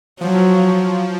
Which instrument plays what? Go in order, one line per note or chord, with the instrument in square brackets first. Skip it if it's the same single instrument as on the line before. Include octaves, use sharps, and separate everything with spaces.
[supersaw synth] F3 [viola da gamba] F#3